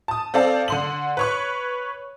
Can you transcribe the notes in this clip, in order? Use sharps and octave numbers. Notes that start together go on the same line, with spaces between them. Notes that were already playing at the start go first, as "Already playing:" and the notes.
A5 D#6
C4 A4 D5 F5 A5
D3 C6 F#7
B4 C#5 C#6